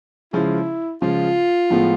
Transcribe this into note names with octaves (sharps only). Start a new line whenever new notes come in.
C#3 F3 G#3 E4
C#3 F3 G#3 F4
A2 F3 G#3 B3